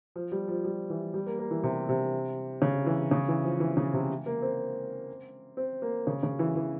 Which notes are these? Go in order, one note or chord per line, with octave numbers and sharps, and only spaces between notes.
F3
G3
F3
G3
E3
G3
A#3
A#3
E3
C3
C3
C#3
E3
C#3
E3
F3
E3
C#3
C3
A#3
C4
C4
A#3
C#3
C#3
E3
E3